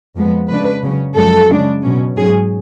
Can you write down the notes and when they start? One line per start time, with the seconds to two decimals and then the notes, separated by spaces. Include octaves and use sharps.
0.16 F2 F3 G#3 B3
0.49 F2 C#3 G#3 D4 B4
0.82 C#3 F#3 C#4
1.16 F#2 F3 G#3 A4
1.49 C#3 G#3 D4
1.83 B2 F#3 C#4
2.16 G#2 F#3 C#4 G#4